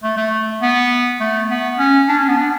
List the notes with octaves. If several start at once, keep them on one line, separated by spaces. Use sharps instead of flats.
A3
A3
B3
A3
B3
C#4
D4
C#4
B3
D4